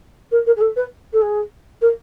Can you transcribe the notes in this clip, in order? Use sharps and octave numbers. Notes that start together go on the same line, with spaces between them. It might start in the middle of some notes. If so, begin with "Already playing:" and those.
A#4
A#4
G#4
A4
B4
A4
G#4
A#4